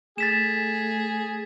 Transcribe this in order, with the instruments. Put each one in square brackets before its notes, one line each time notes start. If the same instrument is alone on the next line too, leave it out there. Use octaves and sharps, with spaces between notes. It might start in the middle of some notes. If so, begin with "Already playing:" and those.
[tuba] A3 [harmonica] G#4 [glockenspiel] A6 B6 E7